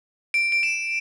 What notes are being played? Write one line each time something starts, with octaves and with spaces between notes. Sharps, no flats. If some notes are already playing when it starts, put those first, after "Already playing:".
D7
D7
E7